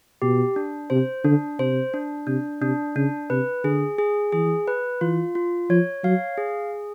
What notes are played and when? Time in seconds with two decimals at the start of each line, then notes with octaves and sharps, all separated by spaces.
0.22 B2 G4
0.56 D4
0.90 C3 C5
1.24 D3 D4
1.59 C3 C5
1.94 D4
2.27 C3 D4
2.61 C3 D4
2.96 C#3 D4
3.30 C3 B4
3.64 D3 G#4
3.98 G#4
4.32 E3 G#4
4.68 B4
5.01 E3 F4
5.35 F4
5.70 F3 C#5
6.04 F#3 F5
6.38 G#4